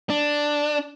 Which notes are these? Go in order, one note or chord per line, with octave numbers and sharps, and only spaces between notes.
D4